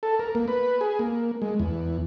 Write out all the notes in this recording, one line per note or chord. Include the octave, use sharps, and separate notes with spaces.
A4
A#4
A#3
B4
G#4
A#3
G#3
E2